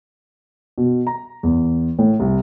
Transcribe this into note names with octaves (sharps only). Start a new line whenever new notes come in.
B2
A#5
E2
A2
C2